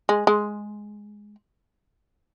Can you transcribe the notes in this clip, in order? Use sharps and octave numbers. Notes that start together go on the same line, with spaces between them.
G#3
G#3